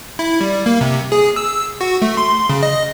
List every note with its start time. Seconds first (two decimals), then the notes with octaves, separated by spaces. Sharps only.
0.19 E4
0.41 G3
0.66 A#3
0.81 C3
1.12 G#4
1.36 E6
1.81 F#4
2.02 A3
2.17 C6
2.49 C#3
2.63 D#5